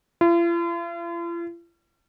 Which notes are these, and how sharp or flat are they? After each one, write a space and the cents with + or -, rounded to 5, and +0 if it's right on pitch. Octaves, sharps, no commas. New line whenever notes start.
F4 -45